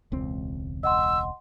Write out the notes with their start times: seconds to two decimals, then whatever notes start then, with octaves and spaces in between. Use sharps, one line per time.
0.12 E1 C#2 C4
0.83 D#5 F#5 C6 E6